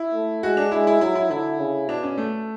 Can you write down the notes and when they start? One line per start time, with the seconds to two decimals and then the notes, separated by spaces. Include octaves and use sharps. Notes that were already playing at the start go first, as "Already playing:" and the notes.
Already playing: E4
0.13 A3
0.43 G#3 F#4
0.57 D4
0.72 G#3 E4
0.87 E4
1.01 F#3 E4
1.15 E4
1.30 D3 E4
1.59 C#3
1.88 B2 D4
2.03 C#4
2.18 A3